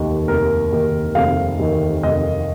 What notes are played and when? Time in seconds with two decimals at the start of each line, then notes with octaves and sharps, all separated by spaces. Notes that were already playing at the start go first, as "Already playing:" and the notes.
Already playing: F1 D#2 D#3 A#3
0.28 F1 A#4
0.73 D#2 D#3 A#3
1.15 F1 F5
1.59 D#2 D#3 A#3
2.03 F1 D#5